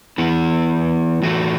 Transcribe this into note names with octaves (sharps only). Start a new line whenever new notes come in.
E3 B3 E4
A2 E3 A3 F#4